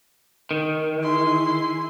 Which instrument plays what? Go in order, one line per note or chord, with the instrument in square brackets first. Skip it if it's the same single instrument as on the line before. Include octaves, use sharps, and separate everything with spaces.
[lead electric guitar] D#3
[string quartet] E4 G#4 C6